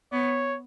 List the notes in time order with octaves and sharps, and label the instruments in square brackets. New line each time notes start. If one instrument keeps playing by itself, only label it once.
[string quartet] B3 [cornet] C#5